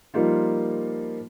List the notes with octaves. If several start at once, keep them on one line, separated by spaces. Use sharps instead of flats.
F3 G3 A#3 D#4 F4